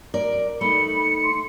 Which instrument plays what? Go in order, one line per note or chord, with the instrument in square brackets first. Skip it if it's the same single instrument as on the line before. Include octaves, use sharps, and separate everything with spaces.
[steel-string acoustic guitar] A#4 D5
[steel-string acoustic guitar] A3 D#4 [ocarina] B5 [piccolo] C#7
[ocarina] C6